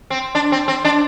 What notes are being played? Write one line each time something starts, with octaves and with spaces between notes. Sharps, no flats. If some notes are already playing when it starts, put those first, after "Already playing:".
C4
D4
C4
C4
D4